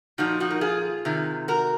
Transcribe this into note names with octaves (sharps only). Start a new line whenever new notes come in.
A#2 F3 D#4 F#4
D#4 F#4
A#4
F4 G#4
C3 D#3
F#4 A#4